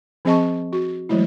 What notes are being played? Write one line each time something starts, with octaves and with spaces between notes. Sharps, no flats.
F3 C4 G#4 D#5 A5 C#6
F#4
E3 F#3 G#3 A3 E4